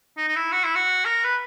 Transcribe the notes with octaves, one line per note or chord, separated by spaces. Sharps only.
D#4
D#4
E4
F#4
E4
F#4
A#4
B4